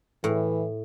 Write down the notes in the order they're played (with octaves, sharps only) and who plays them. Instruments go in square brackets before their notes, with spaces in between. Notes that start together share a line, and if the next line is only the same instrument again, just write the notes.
[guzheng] A2 [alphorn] E3